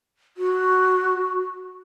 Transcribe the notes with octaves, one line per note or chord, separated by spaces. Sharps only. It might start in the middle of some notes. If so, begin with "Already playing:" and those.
F#4